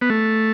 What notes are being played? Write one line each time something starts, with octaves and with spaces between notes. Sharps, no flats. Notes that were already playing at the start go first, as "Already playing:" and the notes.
B3
A3